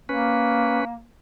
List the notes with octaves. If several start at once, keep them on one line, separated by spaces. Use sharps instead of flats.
A#3 C#4 B4